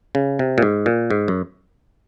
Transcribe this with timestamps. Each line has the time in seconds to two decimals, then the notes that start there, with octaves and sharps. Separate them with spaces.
0.15 C#3
0.39 C3
0.58 A#2
0.62 G#2
0.86 A#2
1.10 G#2
1.28 F#2